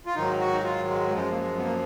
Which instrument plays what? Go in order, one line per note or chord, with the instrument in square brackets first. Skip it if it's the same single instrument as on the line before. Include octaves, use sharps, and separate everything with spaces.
[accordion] F4
G#2 D#3 F#3 D#4
F#4
D#4
F4
G#3
F#2 F3 G#3
A#3
G#3
B3
A#3